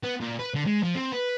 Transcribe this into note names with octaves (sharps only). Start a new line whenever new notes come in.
B3
A#2
B4
D3
G#3
F3
C4
B4